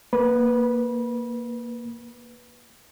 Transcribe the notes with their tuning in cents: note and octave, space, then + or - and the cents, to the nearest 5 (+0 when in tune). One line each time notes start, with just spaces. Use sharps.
A#3 +0 B4 +0 B5 -25